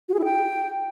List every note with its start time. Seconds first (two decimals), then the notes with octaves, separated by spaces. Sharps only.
0.09 F#4
0.14 G#4
0.19 E4
0.24 G5